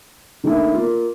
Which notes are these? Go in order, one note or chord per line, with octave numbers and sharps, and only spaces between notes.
D3 D#3 A3 A#3 E4
A#3 F4